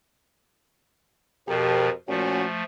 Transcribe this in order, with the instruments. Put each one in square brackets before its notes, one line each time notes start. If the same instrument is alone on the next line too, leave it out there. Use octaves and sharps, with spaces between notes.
[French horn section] F2 G4 A#4 [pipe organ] B2 F3
[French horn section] A#2 C#4 F#4 [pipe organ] F3 A3